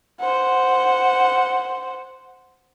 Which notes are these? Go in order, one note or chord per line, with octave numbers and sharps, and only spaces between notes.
C5 F#5